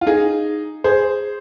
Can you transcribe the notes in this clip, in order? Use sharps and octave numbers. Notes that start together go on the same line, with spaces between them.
F4
D#4 G#4
G#4 C5